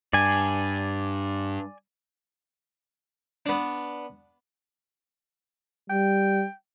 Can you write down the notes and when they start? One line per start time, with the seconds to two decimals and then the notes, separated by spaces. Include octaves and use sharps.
0.13 G2 D5 G#5
3.46 B3 D4
5.90 G3 G5